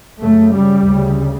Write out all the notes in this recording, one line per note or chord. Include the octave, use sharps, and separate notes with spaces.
F#2 C#3 A3
G3
D2 C#3